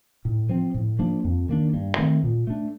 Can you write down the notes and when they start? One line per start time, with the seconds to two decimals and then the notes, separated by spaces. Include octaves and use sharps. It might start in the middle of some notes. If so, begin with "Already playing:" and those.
0.25 A2
0.49 F3 C4
0.74 A2
0.99 F3 A#3 D4
1.24 F2
1.49 D#3 A#3 D4
1.74 G2
1.98 D#3 A3 C4
2.23 A#2
2.47 A3 D4